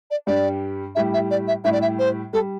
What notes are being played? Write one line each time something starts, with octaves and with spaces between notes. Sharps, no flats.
D5
G2 G3 D4 G4 D5
A2 G3 E4 G4 E5
E5
D5
E5
A2 G3 E4 G4 E5
D5
E5
C5
G3 A4